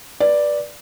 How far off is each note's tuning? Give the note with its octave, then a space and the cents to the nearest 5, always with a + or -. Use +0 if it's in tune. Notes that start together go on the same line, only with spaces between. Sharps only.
B4 -25 D5 +0